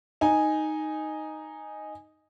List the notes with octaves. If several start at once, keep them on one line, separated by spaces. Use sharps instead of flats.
D#4 G#5